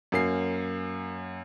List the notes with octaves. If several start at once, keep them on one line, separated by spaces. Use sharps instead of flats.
F#2 A#3 C7